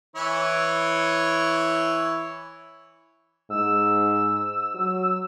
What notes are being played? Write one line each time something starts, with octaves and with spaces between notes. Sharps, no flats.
E3 E4 C#5
G#2 E6
F#3